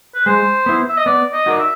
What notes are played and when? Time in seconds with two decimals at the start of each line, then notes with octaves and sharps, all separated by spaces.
0.15 B4
0.26 G#3 C5
0.66 B3 E4
0.89 E5
0.97 D#5
1.06 B3 D5
1.33 D#5
1.46 D#4 F#4 A#4 D5
1.59 E5